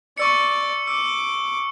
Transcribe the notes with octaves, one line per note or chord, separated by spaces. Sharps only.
D5 C#6 E6 C#7
D6 E6